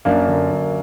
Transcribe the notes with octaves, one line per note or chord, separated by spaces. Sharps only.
F#2 A#3 D4
D3
F#2